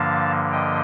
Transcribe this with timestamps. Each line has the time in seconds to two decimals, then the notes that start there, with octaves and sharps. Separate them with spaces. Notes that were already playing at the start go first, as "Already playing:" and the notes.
Already playing: G2 D3 F3 A#3 F5 A5
0.52 D#5 G5